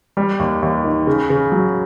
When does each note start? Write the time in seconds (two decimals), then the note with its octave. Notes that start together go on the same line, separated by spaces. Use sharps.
0.17 G3
0.39 D#2
0.62 D#2
0.84 D#3
1.07 C#3
1.30 C#3
1.52 F#3